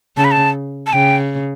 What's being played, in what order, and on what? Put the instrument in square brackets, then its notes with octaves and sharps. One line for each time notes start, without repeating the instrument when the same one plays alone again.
[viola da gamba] C#3 [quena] A5
[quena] B5
A5
A5
[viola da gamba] C#3 [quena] G5